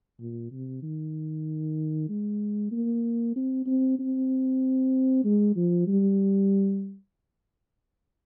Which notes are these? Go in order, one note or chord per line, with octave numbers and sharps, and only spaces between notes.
A#2
C3
D#3
G#3
A#3
C4
C4
C4
G#3
F3
G3